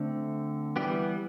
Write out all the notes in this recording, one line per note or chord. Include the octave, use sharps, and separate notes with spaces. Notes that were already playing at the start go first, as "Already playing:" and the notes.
Already playing: D3 A3 C4
E3 G3 B3 G4